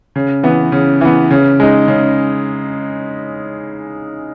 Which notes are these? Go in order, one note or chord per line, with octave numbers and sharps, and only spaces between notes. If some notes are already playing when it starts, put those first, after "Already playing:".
C#3
E3 B3
C#3
E3 B3
C#3
G#3 D#4
C#3